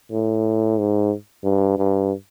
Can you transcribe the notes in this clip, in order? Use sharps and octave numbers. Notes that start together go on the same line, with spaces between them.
A2
G#2
G2
G2